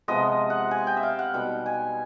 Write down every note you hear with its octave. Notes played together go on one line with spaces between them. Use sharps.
C3 F3 G#3 B3 D#5
F#5
G#5
G5
E5
F5
F#5
B2 G3 B3 D#4 G5
G#5